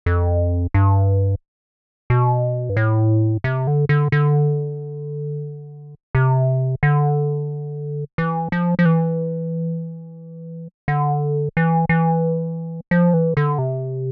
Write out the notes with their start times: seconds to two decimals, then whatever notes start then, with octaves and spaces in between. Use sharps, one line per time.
0.06 F2
0.74 G2
2.10 B2
2.70 G2
2.77 A2
3.44 C3
3.67 D3
3.89 D3
4.12 D3
6.15 C3
6.83 D3
8.18 E3
8.52 F3
8.79 F3
8.85 E3
10.88 D3
11.57 E3
11.89 E3
12.91 F3
13.14 E3
13.37 D3
13.58 C3